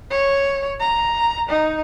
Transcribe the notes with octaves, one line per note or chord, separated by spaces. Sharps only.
C#5
A#5
D#4